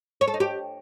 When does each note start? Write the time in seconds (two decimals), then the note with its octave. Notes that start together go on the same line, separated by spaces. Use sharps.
0.21 C#5
0.27 A4
0.34 D#4
0.40 G4